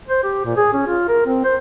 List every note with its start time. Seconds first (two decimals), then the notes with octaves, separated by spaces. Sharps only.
0.09 C5
0.24 G4
0.45 A#2
0.57 G#4
0.73 C#4
0.87 F4
1.09 A#4
1.26 C4
1.45 C5